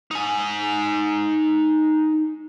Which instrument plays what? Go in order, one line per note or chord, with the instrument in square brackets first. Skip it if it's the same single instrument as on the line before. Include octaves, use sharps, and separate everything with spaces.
[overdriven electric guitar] D#4 G#5